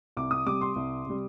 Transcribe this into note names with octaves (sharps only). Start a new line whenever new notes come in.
C2 D6
D#6
C3 G3 D6
C6
C2
C3 G3